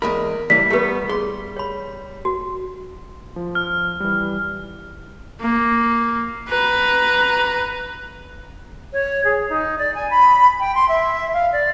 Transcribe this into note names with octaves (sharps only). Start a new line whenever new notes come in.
E2 G#3 A#4 B5
C#2 E3 G3 B6
A3 B3 E4 G4 B4
G#4 C6
C#5 B5
F#4
F3
F6
E3 G3
A#3
B4 A#5
C#5
G#4
D#4
D5
G#5
B5
G5
C6
E5
F5
D5